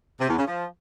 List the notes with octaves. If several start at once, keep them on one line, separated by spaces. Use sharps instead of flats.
C3
E2
C#3
F3